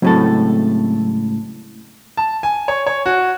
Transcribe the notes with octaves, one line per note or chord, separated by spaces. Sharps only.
C#2 A2 F#3 C4 A4
A5
G#5
C#5
C#5
F#4